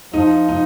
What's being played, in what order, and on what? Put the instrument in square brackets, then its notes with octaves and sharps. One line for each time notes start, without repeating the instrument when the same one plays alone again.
[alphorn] F3 [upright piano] D#4
[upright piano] D#4